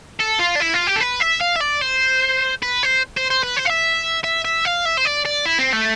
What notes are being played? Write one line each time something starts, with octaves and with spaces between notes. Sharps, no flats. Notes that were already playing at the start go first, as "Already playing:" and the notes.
A4
F4
D4
E4
F4
G4
A4
B4
E5
F5
E5
D5
C5
B4
C5
C5
C5
B4
C5
F5
E5
E5
E5
F5
E5
C5
D5
D5
E4
C4
A3